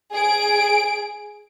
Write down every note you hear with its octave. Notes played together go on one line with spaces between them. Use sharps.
G#4 D7